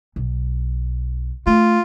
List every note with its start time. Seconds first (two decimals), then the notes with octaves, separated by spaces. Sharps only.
0.16 B1
1.47 A3 F4